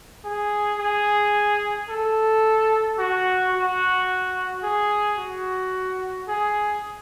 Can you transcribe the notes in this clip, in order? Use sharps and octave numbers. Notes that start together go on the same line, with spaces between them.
G#4
G#4
A4
F#4
F#4
G#4
F#4
G#4